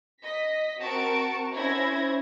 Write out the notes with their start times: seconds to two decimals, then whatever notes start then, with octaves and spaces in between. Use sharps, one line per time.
0.22 D#5 A#6 B6
0.81 C4 F#4 A#4 A5 C#6 D7
1.53 C#4 E4 C5 G#6 A#6